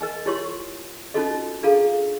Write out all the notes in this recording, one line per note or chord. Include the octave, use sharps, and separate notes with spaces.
A#4 D#5 G#5
E4 F4 G4 C#5 C6 C#6
C#4 D#4 F4 F#4 A4 D#5
D4 F4 G#4 A4 F5 A#5